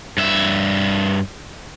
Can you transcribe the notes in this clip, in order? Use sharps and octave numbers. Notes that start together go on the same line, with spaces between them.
G2 E5